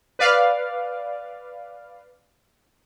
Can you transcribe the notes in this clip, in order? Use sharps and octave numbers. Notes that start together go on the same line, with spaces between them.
B4 D5 F5